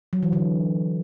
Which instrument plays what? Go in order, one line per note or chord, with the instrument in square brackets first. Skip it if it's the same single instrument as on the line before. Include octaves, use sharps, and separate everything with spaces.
[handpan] F#3
E3
D3